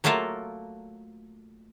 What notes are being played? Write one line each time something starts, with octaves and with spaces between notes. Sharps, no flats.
F#3 A3 A#3 F4 A4 A#4